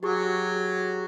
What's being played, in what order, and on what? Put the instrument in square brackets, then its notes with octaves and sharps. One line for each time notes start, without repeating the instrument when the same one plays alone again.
[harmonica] F#3 [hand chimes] G4 G#4 C#6